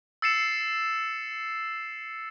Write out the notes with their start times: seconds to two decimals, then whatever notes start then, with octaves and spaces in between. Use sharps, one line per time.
0.22 E6 A6 C7 C#7 E7